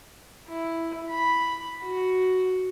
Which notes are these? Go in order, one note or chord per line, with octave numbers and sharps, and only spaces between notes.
E4
B5
F#4